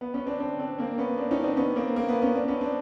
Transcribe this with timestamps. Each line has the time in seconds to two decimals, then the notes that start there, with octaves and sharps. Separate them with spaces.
0.01 B3
0.14 B3 C#4
0.27 C4 D4
0.40 C4 D4
0.60 C4 D4
0.79 A#3 C4
0.98 B3 C#4
1.18 C4 D4
1.31 C#4 D#4
1.44 C4 D4
1.57 B3 C#4
1.76 A#3 C4
1.96 A#3
2.08 B3
2.22 B3 C#4
2.35 C4 D4
2.48 B3 C#4
2.61 C4 D4